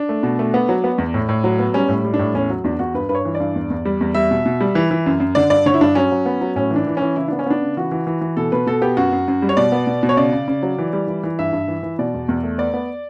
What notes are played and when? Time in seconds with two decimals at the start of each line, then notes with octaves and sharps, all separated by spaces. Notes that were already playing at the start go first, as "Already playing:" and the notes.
Already playing: D4
0.09 A3
0.23 B2
0.39 A3
0.54 B3
0.69 F#3
0.84 B3
0.98 E2
1.14 A2
1.29 A2
1.44 F#3
1.59 B3
1.74 G3 C#4
1.89 A2
2.05 G3
2.14 D4
2.19 A2
2.34 E2 C#4
2.50 F#3
2.64 E2 D4
2.79 E2 F#4
2.94 G2 B4
3.09 G2 B4
3.15 C#5
3.25 E3
3.35 D5
3.40 G2
3.55 E2
3.70 E2
3.86 G3
4.01 E2
4.15 G3 E5
4.31 B2
4.46 B2
4.61 G3
4.75 E3
4.91 E3
5.06 F#2
5.20 F#2
5.35 D3 D5
5.50 G2 D5
5.66 D3 C#5
5.74 E4
5.81 G2 D4
5.95 F#3 C#4
6.12 F#3
6.26 B3
6.41 F#3
6.56 A2 C#4
6.71 E3
6.76 D4
6.87 E3
6.97 E3 C#4
7.16 C#3 E4
7.28 B3 D4
7.39 C#4
7.46 B3 D4
7.62 C#3
7.77 E3 F#4
7.92 E3
8.07 E3
8.21 E3
8.37 B2 A4
8.52 B2 B4
8.67 B2 A4
8.82 B3 G4
8.97 F#2 F#4
9.12 F#2
9.28 F#2
9.42 G3
9.49 C#5
9.57 B2 D5
9.72 B3
9.87 B2
10.03 B2
10.09 C#5
10.17 C#3 D5
10.33 C#3
10.48 C#3
10.63 F#3
10.79 E3
10.93 G3
11.07 E3
11.24 E3
11.39 G2 E5
11.53 G2
11.68 E3
11.83 E3
11.99 B2 D5
12.14 E2
12.29 E2
12.43 A3
12.58 B3 D5
12.74 B3